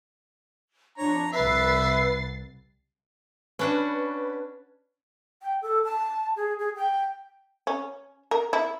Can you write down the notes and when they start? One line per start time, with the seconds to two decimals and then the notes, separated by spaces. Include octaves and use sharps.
0.98 F2 D4 C#5 A#5
1.32 C2 B4 E5 A6 C7
3.59 C#4 D4 F#4 B4
5.42 G5
5.62 A4
5.85 A5
6.36 G#4
6.59 G#4
6.76 G5
7.67 C#4
8.31 A#4
8.53 E4